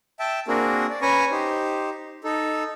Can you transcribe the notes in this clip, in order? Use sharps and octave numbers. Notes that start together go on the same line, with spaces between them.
E5 G5 A5
A#3 C4 D4 F#4 G#4 A#4
D5
C#4 B4 G#5 A#5 C#6
D#4 G4 C5
D#4 A4